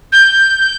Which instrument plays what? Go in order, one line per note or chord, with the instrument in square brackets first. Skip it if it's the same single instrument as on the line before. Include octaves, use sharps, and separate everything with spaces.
[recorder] G6